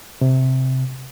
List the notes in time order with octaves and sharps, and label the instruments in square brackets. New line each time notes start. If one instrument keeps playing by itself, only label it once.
[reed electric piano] C3